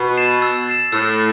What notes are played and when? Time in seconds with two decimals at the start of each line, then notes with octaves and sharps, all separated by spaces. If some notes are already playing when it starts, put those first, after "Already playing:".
Already playing: B2
0.17 A6 C7 E7
0.42 E6
0.68 A6 C7 E7
0.92 A2 E6